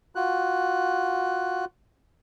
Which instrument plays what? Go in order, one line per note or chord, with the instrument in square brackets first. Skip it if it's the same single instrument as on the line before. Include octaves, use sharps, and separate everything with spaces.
[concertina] F4 F#4 F#6